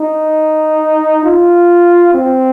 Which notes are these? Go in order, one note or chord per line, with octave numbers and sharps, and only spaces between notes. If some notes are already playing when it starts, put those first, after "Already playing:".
Already playing: D#4
F4
C4